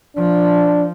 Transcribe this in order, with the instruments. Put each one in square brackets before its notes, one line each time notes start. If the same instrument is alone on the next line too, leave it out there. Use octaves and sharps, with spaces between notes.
[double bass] F3 [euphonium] D4